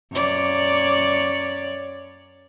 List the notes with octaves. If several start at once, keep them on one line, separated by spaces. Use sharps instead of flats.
F#2 C#5 D5